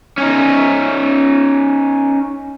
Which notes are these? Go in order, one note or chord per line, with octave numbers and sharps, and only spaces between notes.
C#4 D#4